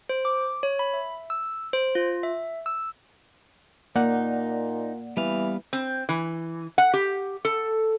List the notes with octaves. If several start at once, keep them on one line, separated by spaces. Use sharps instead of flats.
C5
D6
C#5
B5
E5
E6
C5
F4
E5
E6
A#2 A#3 D#4 D5 F#5
E3 G3 B3 F5
C4
E3
F#5
G4
A4